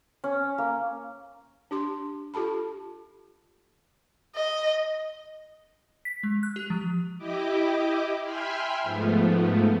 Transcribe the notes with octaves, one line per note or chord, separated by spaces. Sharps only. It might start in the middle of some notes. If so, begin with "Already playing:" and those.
C#4
A#3
D4 G4 C6
F4 G4 A4 A5 B5
D#5
B6
G#3
F#6
G4
F3
E4 G4 D#5 D6
E5 G5 G#5 B5 C6 F6
G#2 F3 A3 B3